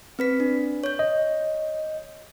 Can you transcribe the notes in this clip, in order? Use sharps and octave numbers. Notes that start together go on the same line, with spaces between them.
C4 B4 B6
D4
C#5 G6
D#5